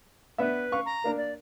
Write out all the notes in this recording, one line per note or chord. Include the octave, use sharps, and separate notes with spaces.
B3 D4 B4 E5
F5 C#6
A#5
A#3 D4 A#4
D5